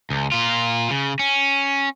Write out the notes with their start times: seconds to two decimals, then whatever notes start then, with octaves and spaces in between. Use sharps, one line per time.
0.10 C#2
0.32 A#2 F4
0.90 C#3
1.19 C#4